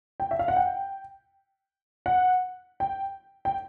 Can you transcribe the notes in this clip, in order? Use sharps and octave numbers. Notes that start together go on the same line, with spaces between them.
G5
E5
F5
F#5
G5
F#5
G5
G5